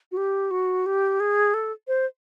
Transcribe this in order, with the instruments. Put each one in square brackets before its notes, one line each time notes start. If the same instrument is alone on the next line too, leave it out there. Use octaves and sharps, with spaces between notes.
[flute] F#4
G4
F#4
G4
G#4
A4
C5